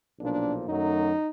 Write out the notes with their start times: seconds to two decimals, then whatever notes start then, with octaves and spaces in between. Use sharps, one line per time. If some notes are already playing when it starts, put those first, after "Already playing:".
0.20 B1 A#2 F3 A#3 D4
0.66 F#2 D#3 F#3 A3 D#4